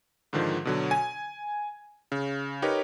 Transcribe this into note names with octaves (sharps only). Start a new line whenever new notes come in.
G#2 D3 D#3 F3
B2 D3 F#3
G#5
C#3
D#4 G4 A#4 B4 C#5